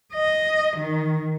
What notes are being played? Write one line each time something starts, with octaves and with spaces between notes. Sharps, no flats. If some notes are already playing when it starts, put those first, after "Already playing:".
D#5
D#3